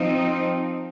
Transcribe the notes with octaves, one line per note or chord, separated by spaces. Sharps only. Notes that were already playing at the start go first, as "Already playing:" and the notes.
Already playing: F3 C4 D#4